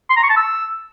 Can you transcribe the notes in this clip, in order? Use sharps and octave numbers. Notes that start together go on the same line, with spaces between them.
C6
A#5
C#6
A5
E6